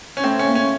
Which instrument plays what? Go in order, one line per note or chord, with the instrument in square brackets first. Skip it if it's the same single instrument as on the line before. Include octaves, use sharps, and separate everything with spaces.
[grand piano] C#4
[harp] A2 [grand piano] C4
[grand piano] C#4
[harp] A#3
[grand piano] C#4